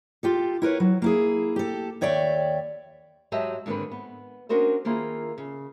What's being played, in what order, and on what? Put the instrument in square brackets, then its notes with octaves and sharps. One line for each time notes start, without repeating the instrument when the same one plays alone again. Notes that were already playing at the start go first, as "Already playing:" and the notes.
[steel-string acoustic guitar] F4 G4 A4
E4 A#4 B4 C#5
F#3
A#3 E4 G#4
G4 A4
D#2 C#5 D5 E5 G5
[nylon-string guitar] G#2 F#3 G4 D#5 E5 A5
G#2 D3 D#3 A3 C4 B4
B3
C#4 D4 F#4 A#4 C5 D#5
D#3 A#3 E4 F4 G#4
C#3